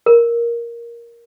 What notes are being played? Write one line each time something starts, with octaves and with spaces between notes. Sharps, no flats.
A#4